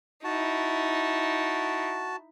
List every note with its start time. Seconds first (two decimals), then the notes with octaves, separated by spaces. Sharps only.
0.24 D#4 E4 F#4 A5